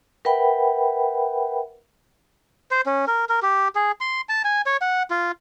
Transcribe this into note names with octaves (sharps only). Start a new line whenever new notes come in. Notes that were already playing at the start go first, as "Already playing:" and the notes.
A#4 B4 E5 F#5 G5 B5
C5
C#4
A#4
A#4
G4
G#4
C6
A5
G#5
C#5
F#5
F4